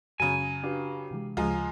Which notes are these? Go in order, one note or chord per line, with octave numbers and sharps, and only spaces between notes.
F#2 C#3 F#3 G#5
D4 F#4 G4 B4 F5
C3 E3 G#3
D2 C#3 F3 G#3 G#5 A#5 F6